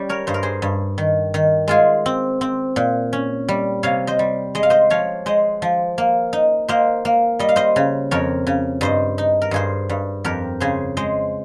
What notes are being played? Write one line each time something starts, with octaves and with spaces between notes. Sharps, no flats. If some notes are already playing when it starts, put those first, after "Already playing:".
Already playing: G3 C#4 G4
A#4 C#5
G2 C5
A#4
G#4 C5
G2
D#3
D#3
G#3 F4 G#4
C4
C4
A#2
C#4
G3
C3 C#5 F5
C5 D#5
G3
G#3 D#5
F5
C5 D#5
F3 C#5 F5
G#3 C5 D#5
F3
A#3
D#4
A#3 C5 D#5
A#3
G3 D#5
F5
C5 D#5
C#3
F2 A#4 C#5
C#3
G2 C5 D#5
D#4
A#4
G2 G#4 C5
G2
F2 G4 A#4
C#3 G#4 C5
G#3 C5 D#5